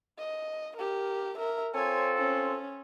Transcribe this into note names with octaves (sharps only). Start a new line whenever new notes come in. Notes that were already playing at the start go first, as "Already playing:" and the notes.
D#5
G4 A#4
A#4 E5
C4 F4 A4 C#5 G#5
C#4